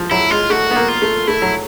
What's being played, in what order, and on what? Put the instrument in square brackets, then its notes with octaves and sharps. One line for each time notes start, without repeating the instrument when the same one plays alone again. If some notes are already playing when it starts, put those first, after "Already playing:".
Already playing: [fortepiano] F3
[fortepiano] F#3 [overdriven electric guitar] E4
[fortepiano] G#3 [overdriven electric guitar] F4
[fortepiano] A3 [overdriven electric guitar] F#4
[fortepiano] B3
A#3
[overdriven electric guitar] F4
[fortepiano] A3
[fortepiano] A3 [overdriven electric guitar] E4
[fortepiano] F#3